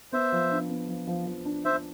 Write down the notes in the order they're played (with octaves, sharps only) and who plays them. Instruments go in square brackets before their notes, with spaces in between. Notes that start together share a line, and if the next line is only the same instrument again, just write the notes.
[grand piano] B3 [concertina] C5 E5
[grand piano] F3
D4
B3
F3
F3
F3
D4
[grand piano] D4 [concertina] C5 E5